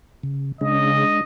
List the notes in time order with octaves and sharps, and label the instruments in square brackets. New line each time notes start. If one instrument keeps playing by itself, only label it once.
[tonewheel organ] C#3
[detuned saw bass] C#3 [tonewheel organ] G#3 D4 [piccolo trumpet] D#5